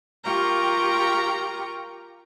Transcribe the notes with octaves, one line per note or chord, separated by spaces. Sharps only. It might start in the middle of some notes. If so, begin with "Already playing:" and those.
F4 G4 A#4 G5 A#5 C#6